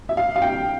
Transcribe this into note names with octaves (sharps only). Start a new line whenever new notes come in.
E5
F5
F5
G5